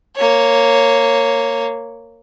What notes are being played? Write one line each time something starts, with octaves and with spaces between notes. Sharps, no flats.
A#3 C#5